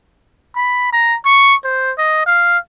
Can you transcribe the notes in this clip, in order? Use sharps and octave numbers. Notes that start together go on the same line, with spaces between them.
B5
A#5
C#6
C5
D#5
F5